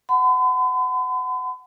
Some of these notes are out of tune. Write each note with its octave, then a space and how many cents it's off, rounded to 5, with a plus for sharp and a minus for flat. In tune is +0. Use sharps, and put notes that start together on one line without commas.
F#5 +0 B5 +45